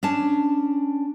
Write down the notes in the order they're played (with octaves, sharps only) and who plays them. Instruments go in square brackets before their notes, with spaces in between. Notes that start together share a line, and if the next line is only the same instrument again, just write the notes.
[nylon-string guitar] C#4 D4 A5